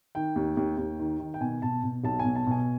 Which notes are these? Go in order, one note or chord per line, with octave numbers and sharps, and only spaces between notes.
D#3 G5
D#2
D#2
D#2
D#3
D#3
G5
B2 G#5
B2 A5
B2
B1 A5
G#5
B2
A5
B2 G#5